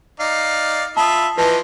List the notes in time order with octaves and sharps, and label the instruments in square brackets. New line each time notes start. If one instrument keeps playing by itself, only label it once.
[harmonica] D#4 D5 F5
[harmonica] F4 E5 B5 [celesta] A5 D#6
[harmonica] E3 F3 D#5 [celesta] B4 A5